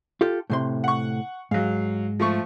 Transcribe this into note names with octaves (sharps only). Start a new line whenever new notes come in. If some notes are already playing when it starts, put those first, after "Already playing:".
F4 G4 A4
A2 C3 C6
F#5 C#6
G#2 F#3 F5
F3 A3 C#6